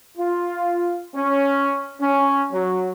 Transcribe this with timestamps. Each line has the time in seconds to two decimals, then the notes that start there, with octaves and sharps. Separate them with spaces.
0.18 F4
1.15 C#4
2.01 C#4
2.53 F#3